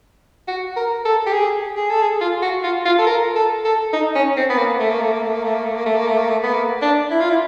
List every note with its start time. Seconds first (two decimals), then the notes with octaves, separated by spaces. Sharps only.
0.48 F#4
0.76 A#4
1.05 A4
1.26 G4
1.34 G#4
1.77 G#4
1.90 A4
2.02 G#4
2.21 F4
2.42 F#4
2.64 F4
2.85 F4
2.98 A4
3.07 A#4
3.36 A4
3.65 A4
3.93 D#4
4.15 C#4
4.37 C4
4.50 B3
4.58 A#3
4.80 A3
4.90 A#3
5.02 A3
5.12 A#3
5.23 A3
5.33 A#3
5.44 A3
5.55 A#3
5.65 A3
5.76 A#3
5.86 A3
5.97 A#3
6.08 A3
6.19 A#3
6.29 A3
6.44 B3
6.53 A#3
6.82 D4
7.11 E4
7.20 F4
7.30 E4